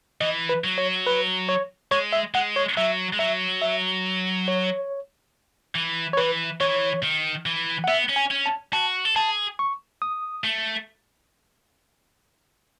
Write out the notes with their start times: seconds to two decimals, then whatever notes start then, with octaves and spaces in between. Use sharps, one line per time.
0.21 E3 D#5
0.49 B4
0.64 F#3
0.78 C#5
1.07 B4
1.49 C#5
1.91 G#3 C#5
2.13 E5
2.34 G#3 F#5
2.56 C#5
2.77 F#3 E5
3.13 G#3
3.19 F#3 E5
3.62 E5
4.48 C#5
5.75 E3
6.13 C#5
6.17 E3 B4
6.60 E3 C#5
7.03 D#3
7.46 E3
7.84 F#5
7.88 B3 E5
8.09 C#4
8.16 G#5
8.31 C#4
8.46 A5
8.73 F#4 A5
9.05 A4
9.16 G#4 A5
9.59 C#6
10.02 D#6
10.44 A3